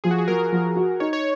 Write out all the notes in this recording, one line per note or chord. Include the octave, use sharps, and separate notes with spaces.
F3 G#4
F#4
G#4
F3 A#4
F3
F#4
D#4 C#5
C#5